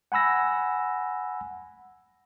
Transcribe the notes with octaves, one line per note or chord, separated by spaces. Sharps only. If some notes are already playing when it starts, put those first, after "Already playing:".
F#5 G#5 B5 E6 A#6